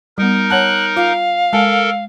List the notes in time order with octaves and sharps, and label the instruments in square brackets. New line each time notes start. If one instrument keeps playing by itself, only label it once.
[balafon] G3 B3 [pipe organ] D#4 A#4
[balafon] C#5 F#5 A5 [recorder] F#6
[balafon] F4 [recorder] F5
[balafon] G#3 G#5 A5 [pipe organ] A4 A#4